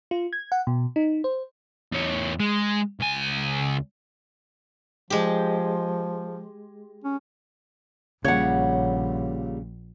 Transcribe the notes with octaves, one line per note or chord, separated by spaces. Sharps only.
F4
G#6
F#5
B2
D#4
C5
E2 C#5
G#3
C#2 G#5
F3 G#3 G4
C#4
A#1 A#2 C#3 G3 C#5 F#5